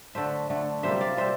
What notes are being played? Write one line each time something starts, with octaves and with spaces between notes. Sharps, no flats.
D3 A3 C5 E5
D3 A3
C3 G3 A#3 C5 E5
D5 F5
C3 G3 C5 E5